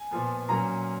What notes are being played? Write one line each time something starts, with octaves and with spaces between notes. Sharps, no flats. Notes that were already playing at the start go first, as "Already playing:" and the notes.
Already playing: G#5
A#2 F3 B3
A#2 F#3 A#3 C#4 A#5